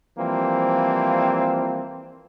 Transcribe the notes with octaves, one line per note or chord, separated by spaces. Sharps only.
E3 F3 G3 A#3 C4